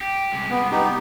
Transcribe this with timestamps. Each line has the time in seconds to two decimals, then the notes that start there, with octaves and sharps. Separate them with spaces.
0.01 G4
0.33 C2 G#3
0.50 B3
0.71 B3 D#4 G4